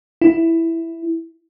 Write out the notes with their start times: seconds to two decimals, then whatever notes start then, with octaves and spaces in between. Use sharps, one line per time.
0.22 E4